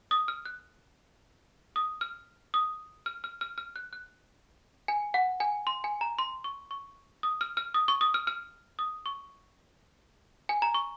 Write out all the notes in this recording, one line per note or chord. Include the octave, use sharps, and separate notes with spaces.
D#6
F6
F#6
D#6
F6
D#6
F6
F6
F6
F6
F#6
F#6
G#5
F#5
G#5
C6
G#5
A#5
C6
C#6
C#6
D#6
F6
F6
D#6
C#6
D#6
F6
F6
D#6
C#6
G#5
A#5
C#6